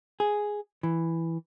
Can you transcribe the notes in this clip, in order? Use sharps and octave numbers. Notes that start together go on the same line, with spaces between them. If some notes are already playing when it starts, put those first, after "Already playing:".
G#4
E3